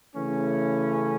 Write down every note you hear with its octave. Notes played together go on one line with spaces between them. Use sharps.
C#3 E3 A3 C#4